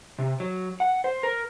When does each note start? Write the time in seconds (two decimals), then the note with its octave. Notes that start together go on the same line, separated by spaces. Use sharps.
0.19 C3
0.40 F#3
0.80 F#5
1.04 C5
1.23 A#4